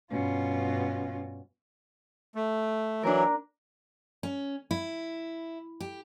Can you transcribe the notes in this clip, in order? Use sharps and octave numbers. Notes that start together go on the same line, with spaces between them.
G2 B2 C#4 F4
A3
E3 F#3 D4 A#4
C#4
E4
G4